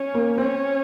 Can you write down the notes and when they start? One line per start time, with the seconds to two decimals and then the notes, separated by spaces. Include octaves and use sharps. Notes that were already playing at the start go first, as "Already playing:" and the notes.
Already playing: C#4
0.14 A#3
0.38 C4 C#4